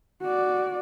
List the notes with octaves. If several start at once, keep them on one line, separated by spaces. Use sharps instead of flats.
F#4 D5